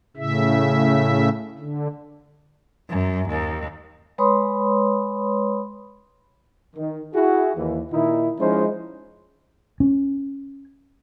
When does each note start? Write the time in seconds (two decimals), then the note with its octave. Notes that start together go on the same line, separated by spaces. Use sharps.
0.17 A2 C#3 E5
1.58 D3
2.89 F#2
3.28 D#2
4.18 G#3 B4 C#5 B5 C6 D#6
6.76 D#3
7.14 E4 F#4 G#4
7.57 D#2 E3
7.93 A#2 D#3 D#4 E4
8.39 F3 G#3 C#4 D#4 E4 C5
9.80 C#4